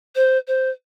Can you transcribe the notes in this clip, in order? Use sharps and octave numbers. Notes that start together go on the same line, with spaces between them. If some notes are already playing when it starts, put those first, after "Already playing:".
C5
C5